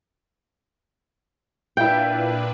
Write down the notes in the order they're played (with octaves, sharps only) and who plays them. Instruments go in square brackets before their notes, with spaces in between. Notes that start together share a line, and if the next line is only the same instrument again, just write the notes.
[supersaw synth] A#2 D4 B4 [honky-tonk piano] E4 F5 [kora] G5